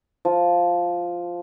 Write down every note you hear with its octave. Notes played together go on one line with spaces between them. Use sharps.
F3